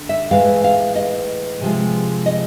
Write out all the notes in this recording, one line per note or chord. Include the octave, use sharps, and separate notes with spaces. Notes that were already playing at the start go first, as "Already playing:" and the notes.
Already playing: D3
E5
A2 E3 G#3 F5
F5
D#5
C3 F3 G#3
D#5